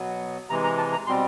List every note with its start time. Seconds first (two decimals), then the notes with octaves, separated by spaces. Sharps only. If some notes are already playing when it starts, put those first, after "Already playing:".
Already playing: B2 F#3 B3
0.49 C3 E3 G#3 A#5
0.64 A#5
0.78 A5
0.92 A#5
1.07 B2 G3 C4 C6